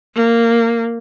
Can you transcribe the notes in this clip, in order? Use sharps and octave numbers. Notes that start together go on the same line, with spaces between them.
A#3